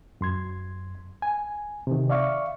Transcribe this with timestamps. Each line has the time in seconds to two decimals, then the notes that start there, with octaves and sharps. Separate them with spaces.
0.21 F#2 C6 G#6
1.22 G#5
1.87 C3 D#3
2.09 D5 E5 F5 C#6